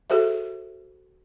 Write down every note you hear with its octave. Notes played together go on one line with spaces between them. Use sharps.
F#4 G#4 A4 C5 E5